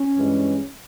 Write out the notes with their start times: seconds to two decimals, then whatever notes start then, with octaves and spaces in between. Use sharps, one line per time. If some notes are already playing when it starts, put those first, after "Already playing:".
Already playing: C#4
0.16 G2 E3 G#3